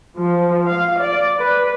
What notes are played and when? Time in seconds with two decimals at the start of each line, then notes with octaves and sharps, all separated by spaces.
0.18 F3
0.68 F5
0.98 D5
1.39 B4